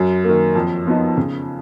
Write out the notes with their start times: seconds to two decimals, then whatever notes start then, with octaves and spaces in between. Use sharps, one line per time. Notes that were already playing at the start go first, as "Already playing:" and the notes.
Already playing: F#2
0.24 D#3 A#3
0.55 F2
0.86 F3 B3 D#4
1.17 C#3